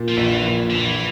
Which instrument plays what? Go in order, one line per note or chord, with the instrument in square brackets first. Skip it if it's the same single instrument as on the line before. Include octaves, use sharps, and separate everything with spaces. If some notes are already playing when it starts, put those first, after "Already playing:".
Already playing: [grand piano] A#2
[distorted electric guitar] F3
[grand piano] A#1 [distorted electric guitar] E3
[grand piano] A#2
[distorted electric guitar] D3
[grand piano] A#1 [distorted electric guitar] E3